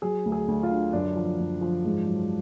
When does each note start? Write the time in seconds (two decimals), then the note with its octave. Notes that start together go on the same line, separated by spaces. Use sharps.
0.02 F#3 G#4
0.25 D2
0.32 G#4
0.48 D2
0.63 F4
0.70 D3
0.93 F#2 D4
1.16 F3
1.39 F#2
1.61 F3
1.84 G#2
2.07 F#3